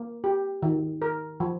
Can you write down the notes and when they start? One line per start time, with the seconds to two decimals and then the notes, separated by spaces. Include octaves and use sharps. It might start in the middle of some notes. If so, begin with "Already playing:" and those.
Already playing: A#3
0.24 G4
0.62 D#3
1.02 A#4
1.40 F3